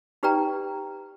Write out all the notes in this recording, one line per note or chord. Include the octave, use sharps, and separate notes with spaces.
D#4 G4 B4 D5 G5 A#5